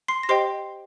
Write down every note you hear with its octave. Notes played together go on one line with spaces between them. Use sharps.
C6 C7
A#6
G4 C5 D#5 G5 C6 C7